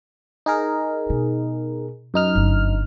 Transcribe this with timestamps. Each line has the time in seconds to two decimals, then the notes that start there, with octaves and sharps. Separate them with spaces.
0.46 D#4 G#4 A#4
1.10 B2
2.14 F#2 D#4 F6
2.35 G1 A3